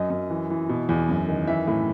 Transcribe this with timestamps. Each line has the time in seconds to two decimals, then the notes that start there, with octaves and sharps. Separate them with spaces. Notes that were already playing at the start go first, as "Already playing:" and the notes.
Already playing: F#2 D#5
0.10 F#2
0.30 E3
0.50 E3
0.69 B2
0.89 E2
1.09 F#2
1.28 D#3
1.47 E3 E5
1.67 A2